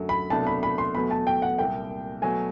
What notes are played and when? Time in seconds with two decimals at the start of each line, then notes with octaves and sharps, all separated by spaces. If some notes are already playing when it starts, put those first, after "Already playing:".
Already playing: F#2 D3 F#3 A3
0.09 B5
0.30 C2 B2 F#3 A3 D4 A5
0.47 B5
0.63 B5
0.78 C6
0.94 E2 B2 F#3 A3 B5
1.11 A5
1.27 G5
1.42 F#5
1.58 C2 A#2 G3 A#3 G5
2.22 B2 F#3 A3 G#5